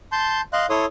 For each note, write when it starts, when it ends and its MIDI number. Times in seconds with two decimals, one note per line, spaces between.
0.12 0.41 81
0.12 0.41 84
0.12 0.41 91
0.53 0.66 75
0.53 0.66 77
0.53 0.66 84
0.53 0.66 90
0.70 0.86 64
0.70 0.86 69
0.70 0.86 73
0.70 0.86 84
0.70 0.86 87